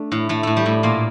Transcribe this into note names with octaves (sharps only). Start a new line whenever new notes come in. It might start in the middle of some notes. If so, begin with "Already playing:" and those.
Already playing: A3 D4
A2
A2 A3
A2 A3
G3
A2
A#2 A#3